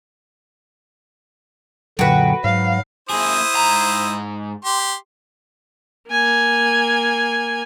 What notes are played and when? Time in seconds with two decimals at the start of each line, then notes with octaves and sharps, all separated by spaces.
1.99 F#2 A#2 D3 F#3 F#4 B4 G5
2.44 G#2 F#3 F5
3.10 A#3 E4 G#4 C5 D#6
3.55 G#2 A#5
4.65 G4 C6
6.10 A#3 G#5